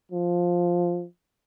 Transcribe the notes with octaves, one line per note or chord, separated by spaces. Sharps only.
F3